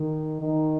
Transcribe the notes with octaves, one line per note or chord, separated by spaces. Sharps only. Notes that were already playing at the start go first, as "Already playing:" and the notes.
Already playing: D#3
D#3